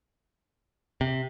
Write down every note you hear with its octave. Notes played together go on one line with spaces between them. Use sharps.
C3